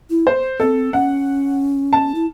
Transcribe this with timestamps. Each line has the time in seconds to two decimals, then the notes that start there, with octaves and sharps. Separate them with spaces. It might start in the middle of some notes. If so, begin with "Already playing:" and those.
0.10 E4
0.27 C5
0.60 C4 A4
0.93 C#4 F#5
1.93 A5
2.15 E4